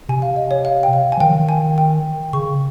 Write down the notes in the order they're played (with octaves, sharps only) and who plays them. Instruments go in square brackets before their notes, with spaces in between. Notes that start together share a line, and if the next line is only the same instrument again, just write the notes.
[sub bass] C3 [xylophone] G#5
[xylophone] F5
D#5
C#5
F5
G5
F5
G#5
[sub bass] F3
[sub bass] D#3 [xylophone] G5
[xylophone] G#5
G5
[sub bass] C#3 [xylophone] C#6